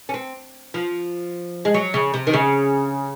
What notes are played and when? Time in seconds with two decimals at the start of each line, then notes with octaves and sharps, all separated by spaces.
0.09 C#4
0.14 C4
0.74 F3
1.65 G#3
1.74 F#3
1.94 C#3
2.14 C3
2.27 D#3
2.34 C#3